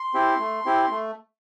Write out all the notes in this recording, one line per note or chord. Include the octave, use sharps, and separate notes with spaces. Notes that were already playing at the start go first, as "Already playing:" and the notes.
Already playing: C6
C4 E4 G4
A3
C4 E4 G4
A3